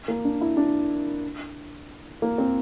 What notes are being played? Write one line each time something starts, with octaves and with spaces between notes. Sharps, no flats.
A#3
D4
E4
D4
A#3
C4